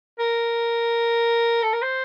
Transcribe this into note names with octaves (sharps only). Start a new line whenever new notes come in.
A#4
A4
A#4
C5